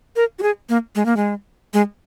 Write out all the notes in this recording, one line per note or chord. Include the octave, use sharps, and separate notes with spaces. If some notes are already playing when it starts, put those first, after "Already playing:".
A#4
F#4
G#4
A#3
G#3
A#3
G#3
G#3